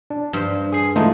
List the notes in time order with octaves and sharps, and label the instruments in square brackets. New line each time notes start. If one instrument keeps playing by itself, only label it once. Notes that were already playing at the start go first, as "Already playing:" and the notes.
[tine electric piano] D4
[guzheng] G2 C5
[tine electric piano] G#4 C7
[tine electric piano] E3 D#4 F4 [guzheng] G#3 [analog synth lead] A3